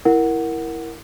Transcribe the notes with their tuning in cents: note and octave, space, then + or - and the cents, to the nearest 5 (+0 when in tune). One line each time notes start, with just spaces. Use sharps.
E4 +0 A#4 +0 F#5 +0